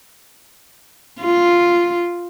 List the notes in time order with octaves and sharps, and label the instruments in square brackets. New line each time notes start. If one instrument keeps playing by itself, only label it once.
[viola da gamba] F4